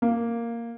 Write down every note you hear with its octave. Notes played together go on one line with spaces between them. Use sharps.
A#3